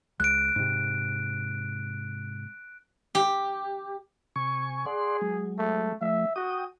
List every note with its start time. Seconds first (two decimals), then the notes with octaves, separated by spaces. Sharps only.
0.20 C#2 F#6 D7
0.56 G#2 C3
3.15 G4
4.36 C3 G#5 C#6
4.86 G#4 D5 F#5 C6
5.21 F#3 G#3
5.58 A3
6.01 F3 A3 E5
6.36 F#4 G5 D#6